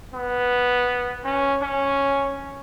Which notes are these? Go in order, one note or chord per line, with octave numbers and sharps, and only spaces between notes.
B3
C#4
C#4